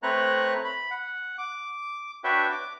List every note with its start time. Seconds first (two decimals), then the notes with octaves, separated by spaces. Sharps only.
0.03 A3 C4 B4 C#5 A#5 F#6
0.64 B5
0.90 F#5
1.38 D6
2.24 D4 F#4 B4 C#5 E5 G5
2.51 D6